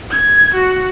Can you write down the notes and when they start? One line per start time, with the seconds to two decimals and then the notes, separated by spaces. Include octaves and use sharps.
0.11 G#6
0.55 F#4